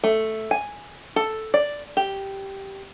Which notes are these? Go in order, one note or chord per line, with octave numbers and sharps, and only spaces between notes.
A3
G#5
A4
D5
G4